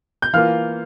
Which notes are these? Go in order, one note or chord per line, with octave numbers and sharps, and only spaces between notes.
G6
E3 A#3 F4 F5 F6